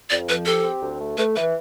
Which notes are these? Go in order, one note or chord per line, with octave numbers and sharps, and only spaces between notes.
F2 D5
F3 B4
G4 A4
C4
D2
A3
A3 B4
E3 B4